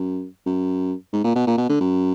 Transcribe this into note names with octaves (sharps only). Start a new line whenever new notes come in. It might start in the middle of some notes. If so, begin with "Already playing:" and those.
Already playing: F#2
F#2
G#2
A#2
B2
A#2
B2
D3
F#2